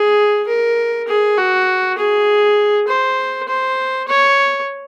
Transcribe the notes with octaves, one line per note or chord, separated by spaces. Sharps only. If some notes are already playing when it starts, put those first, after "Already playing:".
Already playing: G#4
A#4
G#4
F#4
G#4
C5
C5
C#5